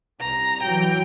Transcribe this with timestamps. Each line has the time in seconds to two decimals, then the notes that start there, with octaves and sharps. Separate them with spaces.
0.20 C2 A#5
0.63 E3 F#3 G5